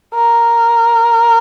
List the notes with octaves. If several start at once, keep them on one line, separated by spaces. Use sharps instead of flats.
A#4